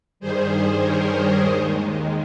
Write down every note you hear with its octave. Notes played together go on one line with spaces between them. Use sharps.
G2 D#3 G3 G#4 C5
A#4 C#5
D#2 D#3 G#3 C5 D#5